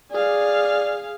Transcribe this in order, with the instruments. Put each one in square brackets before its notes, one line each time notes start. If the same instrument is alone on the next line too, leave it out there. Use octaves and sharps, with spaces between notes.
[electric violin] G#4 F5 [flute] D5